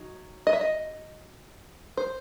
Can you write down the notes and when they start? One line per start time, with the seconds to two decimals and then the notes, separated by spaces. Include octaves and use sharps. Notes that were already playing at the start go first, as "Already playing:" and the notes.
Already playing: F#3 D#4
0.47 D#5
0.53 E5
0.61 D#5
1.97 C5